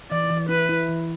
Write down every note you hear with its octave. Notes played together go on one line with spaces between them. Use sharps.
E3 D5
E3
E4 B4
E4
E3